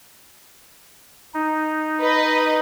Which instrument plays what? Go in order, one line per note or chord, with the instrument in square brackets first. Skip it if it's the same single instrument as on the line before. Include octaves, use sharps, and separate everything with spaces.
[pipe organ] D#4
[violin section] B4 D#5